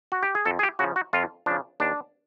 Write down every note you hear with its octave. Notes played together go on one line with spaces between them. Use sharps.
F#4
G4
G#4
F2 A4
G#4
G4
C#3 F3 F#4
F#4
F2 F4
C#3 F3 D4
D#2 D4